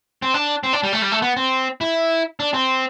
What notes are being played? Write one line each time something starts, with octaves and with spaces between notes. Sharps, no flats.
C4
D4
C4
D4
G3
A3
G3
A3
B3
C4
E4
D4
C4